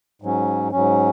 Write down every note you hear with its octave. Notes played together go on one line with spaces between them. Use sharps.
G#2 F#3 C#4
G#2 F#3 C#4